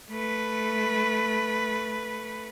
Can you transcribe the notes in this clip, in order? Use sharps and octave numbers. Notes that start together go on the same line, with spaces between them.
A3 B4